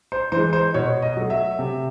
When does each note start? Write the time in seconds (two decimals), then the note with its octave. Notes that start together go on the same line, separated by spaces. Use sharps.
0.12 C5
0.32 E3 G#3 C5
0.53 C5
0.74 B2 C#5
1.02 D#5
1.17 F#3 A3
1.30 E5
1.59 C3